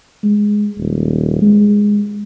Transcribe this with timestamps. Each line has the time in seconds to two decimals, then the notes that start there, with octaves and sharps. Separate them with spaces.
0.23 G#3
0.78 D#1
1.41 G#3